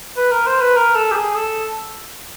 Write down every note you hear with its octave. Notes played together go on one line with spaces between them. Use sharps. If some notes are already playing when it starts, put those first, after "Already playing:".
B4
A#4
C5
B4
A#4
A4
G4
G#4
A4